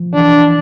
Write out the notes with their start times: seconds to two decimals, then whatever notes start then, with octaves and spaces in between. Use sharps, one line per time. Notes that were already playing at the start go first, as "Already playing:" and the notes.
Already playing: F3
0.13 E3 D4